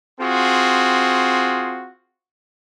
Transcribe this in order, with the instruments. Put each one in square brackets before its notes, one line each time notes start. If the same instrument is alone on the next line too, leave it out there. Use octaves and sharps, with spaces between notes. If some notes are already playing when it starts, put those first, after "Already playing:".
[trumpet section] C4 F4 F#4 G#4